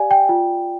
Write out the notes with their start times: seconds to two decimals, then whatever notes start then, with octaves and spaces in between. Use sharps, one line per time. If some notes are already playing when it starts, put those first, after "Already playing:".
Already playing: G4 D5 F5 G#5
0.11 G5
0.29 F4